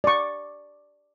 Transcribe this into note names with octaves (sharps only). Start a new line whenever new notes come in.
D5 C#6